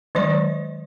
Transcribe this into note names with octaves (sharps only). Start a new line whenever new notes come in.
D#3 F#3 G#3 D5